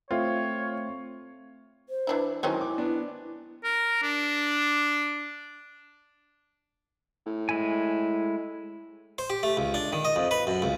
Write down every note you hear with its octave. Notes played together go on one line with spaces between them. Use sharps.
A3 C4 F4 C#5
C5
E3 D4 E4
D#3 F#3 G#3 C4 C#4 E4
D6
B3 D4
A#4
D4
A2
G#3 E4 G#5
C5
G4
A3
C#2
D4
D#3
D#5
F2
B4
F#2
C#2